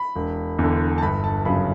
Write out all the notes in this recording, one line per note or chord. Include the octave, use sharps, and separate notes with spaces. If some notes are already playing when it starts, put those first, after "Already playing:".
Already playing: B5
E1
E2 D3
A5
G1 B5
A5
F#2 C#3 F#3 B5